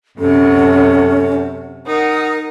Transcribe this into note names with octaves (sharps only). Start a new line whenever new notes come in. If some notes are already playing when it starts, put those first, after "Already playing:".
F#2 C3 C#4 A4 F#5
D#4 A#4 F#5 D#6